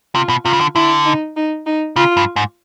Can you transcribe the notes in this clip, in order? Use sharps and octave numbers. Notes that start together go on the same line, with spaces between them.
C3 F4
B2
C3 F4
C#3
D3
D3 E4
D#4
D#4
D#4
C#3 F4
G2
G#2